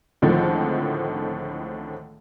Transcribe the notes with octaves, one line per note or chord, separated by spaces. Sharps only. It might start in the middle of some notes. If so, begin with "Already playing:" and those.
C#2 A2 D3 D#3 F3 C4